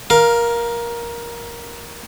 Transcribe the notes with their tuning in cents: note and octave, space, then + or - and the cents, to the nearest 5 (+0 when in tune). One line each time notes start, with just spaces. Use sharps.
A#4 +15 F5 +0